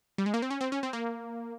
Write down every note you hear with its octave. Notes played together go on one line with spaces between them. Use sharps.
G3
G#3
A#3
C4
C#4
C4
C#4
C4
A#3